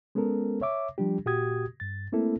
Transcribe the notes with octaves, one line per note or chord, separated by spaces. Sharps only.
G#3 B3 C#4 A4 A#4
C#5 E5 D6
F3 G3 D4 G4
A#2 F#4 G4 D#6 G#6
G2 A6
A3 A#3 C4 E4 A4